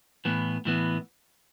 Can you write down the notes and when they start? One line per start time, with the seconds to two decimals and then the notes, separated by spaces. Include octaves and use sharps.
0.25 A2 E3 B3
0.65 A2 E3 B3